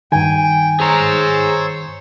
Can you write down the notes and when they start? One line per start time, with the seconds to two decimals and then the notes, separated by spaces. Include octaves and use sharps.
0.12 G2 D#3 G5 G#5
0.80 G#4 C5 C#5 A#5 E6